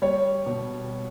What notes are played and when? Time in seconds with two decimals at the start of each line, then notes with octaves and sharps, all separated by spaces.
0.02 G3 C#5
0.46 B2